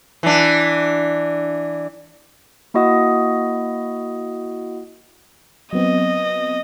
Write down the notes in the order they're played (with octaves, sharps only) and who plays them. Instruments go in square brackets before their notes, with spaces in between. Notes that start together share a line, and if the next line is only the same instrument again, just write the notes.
[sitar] E3 D4
[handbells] A#3 E4 F#4 D#5 F#5 D#6
[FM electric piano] F#3 B3 C4 [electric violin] D#5